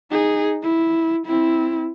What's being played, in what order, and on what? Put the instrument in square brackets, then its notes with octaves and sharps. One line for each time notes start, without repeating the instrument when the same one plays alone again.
[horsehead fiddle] D#4 G#4
E4
C4 E4